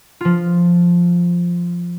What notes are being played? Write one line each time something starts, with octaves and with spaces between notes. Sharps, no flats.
F3 F4